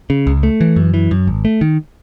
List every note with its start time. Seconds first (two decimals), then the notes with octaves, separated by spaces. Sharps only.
0.10 C#3
0.27 C#2
0.43 A3
0.61 E3
0.76 F#2
0.94 E3
1.11 F#2
1.27 G#1
1.45 A3
1.61 D#3